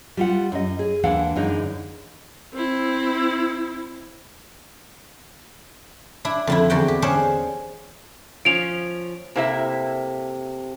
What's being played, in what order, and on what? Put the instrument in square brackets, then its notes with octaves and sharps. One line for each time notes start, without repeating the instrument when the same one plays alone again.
[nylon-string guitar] G3 F4 F#5
F#2 D#5
G#4
D#2 E3 G#3 D4 F5 F#5
F#2 D3 E3 G#3 D#4
[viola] C4 E4
[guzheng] D4 E4
F2 D3 E4
E2 D3 F#4 G5
G4
C#4 D4 G#4 C5 C#5
[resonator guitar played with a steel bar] F3 C#4 [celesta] D7 F7
[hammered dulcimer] C3 A4 [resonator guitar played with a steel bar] A#3 E4 E5